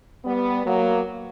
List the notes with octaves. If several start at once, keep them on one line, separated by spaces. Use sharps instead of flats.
G3 B3
F#3 A#3